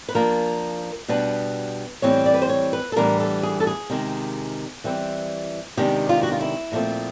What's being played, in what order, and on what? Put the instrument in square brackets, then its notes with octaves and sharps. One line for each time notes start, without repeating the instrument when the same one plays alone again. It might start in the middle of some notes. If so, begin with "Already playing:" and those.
[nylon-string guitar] B4
F3 A#3 D4 A#4
B2 G3 B3 D4 B4
A2 E3 G3 C4 C#5
D5
B4
C5
C#5
B4
A4
A2 E3 G3 B3 D4 A#4
A4
G#4
A4
G#4
C3 D#3 G#3
E3 G3 C4
C3 D#3 G#3 B3 D4 G4
F4
F#4
F4
E4
A#2 F3 A3 C4